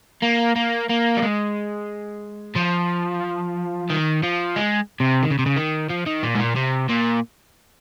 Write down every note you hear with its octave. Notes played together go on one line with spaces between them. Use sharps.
A#3
A#3
A#3
G3
G#3
F3
D#3
F3
G#3
C3
D#3
C#3
C3
C#3
D#3
F3
D#3
A#2
G#2
A#2
C3
A#2